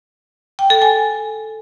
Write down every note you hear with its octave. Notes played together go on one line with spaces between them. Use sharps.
G5
A4
G#5